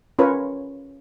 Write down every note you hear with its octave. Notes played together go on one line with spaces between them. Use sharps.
C#4 F4 A#4 B4 C#5